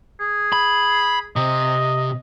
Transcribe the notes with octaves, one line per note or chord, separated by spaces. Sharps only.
G#4
B5
C3 D#5